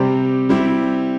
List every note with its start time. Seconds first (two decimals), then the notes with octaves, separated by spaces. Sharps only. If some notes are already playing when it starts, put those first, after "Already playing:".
Already playing: C3 G3 C4 G4
0.49 G3 C4 E4 G4